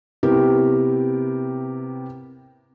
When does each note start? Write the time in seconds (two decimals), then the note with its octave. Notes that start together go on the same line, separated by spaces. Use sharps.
0.23 C3 B3 E4 G4 A#4